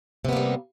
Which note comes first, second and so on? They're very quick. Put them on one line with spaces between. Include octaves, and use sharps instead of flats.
C3 B3 A#3 G3